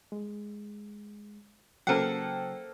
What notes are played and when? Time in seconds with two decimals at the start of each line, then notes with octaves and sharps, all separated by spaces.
0.12 G#3
1.87 C#3 F#3 A#3 A4 C5 F#5 G5